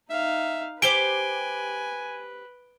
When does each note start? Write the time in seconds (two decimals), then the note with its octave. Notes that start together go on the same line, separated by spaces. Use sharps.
0.10 D#4 E5 F5
0.82 G4 B4 C5 G#5 D6 D7 G7